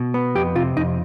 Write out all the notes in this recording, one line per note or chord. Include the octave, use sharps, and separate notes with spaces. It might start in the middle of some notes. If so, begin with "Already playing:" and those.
Already playing: B2
B3
F2 G4
C3 F4
F2 D#4